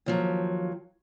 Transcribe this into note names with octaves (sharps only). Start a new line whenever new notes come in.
D#2 F3 F#3